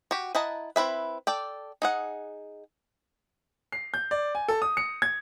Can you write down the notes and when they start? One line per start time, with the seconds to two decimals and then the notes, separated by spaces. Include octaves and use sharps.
0.11 F#4 G4
0.35 E4 D#5 F#5 A5 A#5
0.76 C4 E4 B4 E5
1.27 A4 D5 G5
1.82 D#4 G#4 F#5
3.72 C7
3.94 G6
4.11 D5
4.35 G#5
4.48 A4
4.62 D#6
4.77 C#7
5.02 G#6